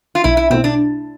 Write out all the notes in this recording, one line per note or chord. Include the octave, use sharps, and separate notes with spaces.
F4
B1 E4
E4
B2 A3 C4 E4
D4